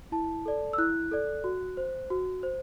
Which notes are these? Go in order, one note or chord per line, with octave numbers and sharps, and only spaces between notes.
E4 A5
A4 D5
E6
E4 F#6
A4 D5
F#4
C5
F#4
C5